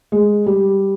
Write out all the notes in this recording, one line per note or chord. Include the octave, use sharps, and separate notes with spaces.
G#3
G3